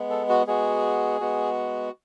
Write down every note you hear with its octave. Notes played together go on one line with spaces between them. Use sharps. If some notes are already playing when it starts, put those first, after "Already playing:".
Already playing: G#3 B3
A4
F#4
G#3 B3 F#4 G#4
G#3 B3 F#4